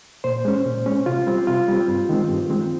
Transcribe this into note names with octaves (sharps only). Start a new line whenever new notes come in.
A#2 C5
G#3 C#4
A#2
G#3 C#4
C3 F4
G3 C4
C3 F4
G3 C4
G2
D#3 G#3 C4
G2
D#3 G#3 C4